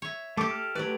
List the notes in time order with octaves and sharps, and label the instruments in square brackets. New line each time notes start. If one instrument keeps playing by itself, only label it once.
[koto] C#5 E5
[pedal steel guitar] A3 D6 [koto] G4 A4
[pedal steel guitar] F6
[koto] F#3 D5 [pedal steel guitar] A3 G4 B4